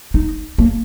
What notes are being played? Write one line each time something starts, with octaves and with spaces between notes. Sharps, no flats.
D#4
A#3